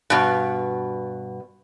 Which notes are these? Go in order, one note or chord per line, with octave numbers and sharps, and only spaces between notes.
G2 B2